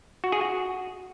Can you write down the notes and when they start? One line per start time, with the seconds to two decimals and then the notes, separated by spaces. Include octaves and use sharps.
0.24 F#4
0.32 G#4
0.41 F#4